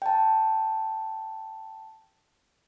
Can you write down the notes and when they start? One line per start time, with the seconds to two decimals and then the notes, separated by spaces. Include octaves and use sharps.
0.02 G5 A5